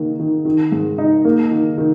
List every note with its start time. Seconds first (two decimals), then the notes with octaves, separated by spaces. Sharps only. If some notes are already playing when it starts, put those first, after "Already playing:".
Already playing: D#3 A#3 D#4
0.19 D#3
0.45 D#3
0.72 G#2
0.98 D#4
1.25 A#3
1.51 D#3
1.78 D#3